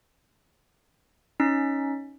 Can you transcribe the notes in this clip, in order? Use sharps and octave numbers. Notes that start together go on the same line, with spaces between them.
C#4 D#4 B6